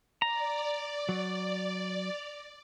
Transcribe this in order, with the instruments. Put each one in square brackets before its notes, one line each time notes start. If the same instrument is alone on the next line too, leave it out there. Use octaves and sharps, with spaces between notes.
[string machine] D5 [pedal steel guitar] A#5
[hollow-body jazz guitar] F#3